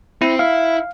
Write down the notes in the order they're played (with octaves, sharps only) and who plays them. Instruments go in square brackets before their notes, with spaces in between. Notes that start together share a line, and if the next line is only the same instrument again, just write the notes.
[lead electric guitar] C4 [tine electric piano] E4
[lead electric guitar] E4 [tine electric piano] F5